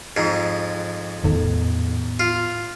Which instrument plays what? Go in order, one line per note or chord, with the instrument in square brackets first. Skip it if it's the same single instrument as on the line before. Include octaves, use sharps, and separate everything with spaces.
[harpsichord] F2 G#2
[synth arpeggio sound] E2 D#3 A4 [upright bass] A2 B3
[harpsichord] F4